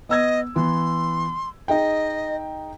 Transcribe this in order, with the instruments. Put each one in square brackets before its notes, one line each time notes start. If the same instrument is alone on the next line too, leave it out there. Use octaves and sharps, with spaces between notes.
[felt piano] B3 E6 G#6 [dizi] D#5
[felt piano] E3 B3 [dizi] C6
[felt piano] D#4 G#4 G5 [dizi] D#5